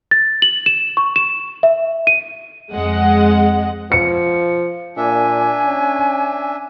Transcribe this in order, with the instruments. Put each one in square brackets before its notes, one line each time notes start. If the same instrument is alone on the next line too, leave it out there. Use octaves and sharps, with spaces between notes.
[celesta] A6
F#7
E7
C#6
E7
E5
D#7
[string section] F2 G#3 D#5 F#5
[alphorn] F3 [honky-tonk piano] C#7
[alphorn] A#2 [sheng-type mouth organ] D4 E5 [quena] G#5
[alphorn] C#4